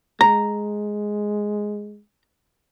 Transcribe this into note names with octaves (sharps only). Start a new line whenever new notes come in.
G#3 A#5